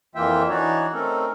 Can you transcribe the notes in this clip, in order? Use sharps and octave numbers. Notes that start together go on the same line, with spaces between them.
F2 E3 A#3 F4 E5 G5
E3 D4 D#4 F#4 C#5 D5
A3 C4 C#4 D#4 A4 A#4